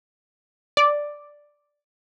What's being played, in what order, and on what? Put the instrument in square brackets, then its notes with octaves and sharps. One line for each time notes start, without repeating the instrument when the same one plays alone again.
[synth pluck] D5